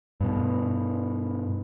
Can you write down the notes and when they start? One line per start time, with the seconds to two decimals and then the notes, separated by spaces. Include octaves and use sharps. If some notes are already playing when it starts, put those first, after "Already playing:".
0.21 G2 B2